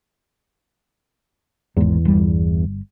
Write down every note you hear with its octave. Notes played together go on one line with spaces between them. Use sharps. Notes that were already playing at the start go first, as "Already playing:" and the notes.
G#1 E2 G#2
G1 G3